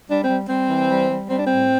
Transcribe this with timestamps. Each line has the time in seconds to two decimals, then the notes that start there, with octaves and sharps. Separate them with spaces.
0.08 G3 D4
0.22 C4
0.28 G3
0.48 G3 C4
0.68 E3
0.89 G3
1.08 G3
1.29 G3 C4
1.38 D4
1.46 A2 C4